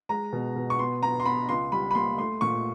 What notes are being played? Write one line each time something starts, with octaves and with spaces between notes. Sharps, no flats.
G#3 A#5
B2
B2
C#6
B3 C6
B3 A#5
C6
B3 B5
C#2 C6
G3 B5
B5
A#3 C6
A3 C6
A#2 C#6